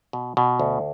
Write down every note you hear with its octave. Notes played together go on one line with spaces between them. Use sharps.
B2
B2
D2